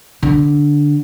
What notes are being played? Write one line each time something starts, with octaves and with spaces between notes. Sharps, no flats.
D3